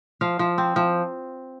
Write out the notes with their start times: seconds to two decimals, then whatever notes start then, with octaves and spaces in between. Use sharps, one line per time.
0.21 F3 F5
0.39 F3
0.58 C4
0.76 F3